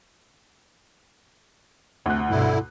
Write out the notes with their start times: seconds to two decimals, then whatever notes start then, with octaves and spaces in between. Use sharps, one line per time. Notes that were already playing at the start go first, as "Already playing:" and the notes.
2.06 D2 C3 F#6
2.30 G2 B2 D3 E4